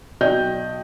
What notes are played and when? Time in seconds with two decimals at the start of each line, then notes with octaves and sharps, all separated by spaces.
0.21 B1 D5 D#5 G5 G6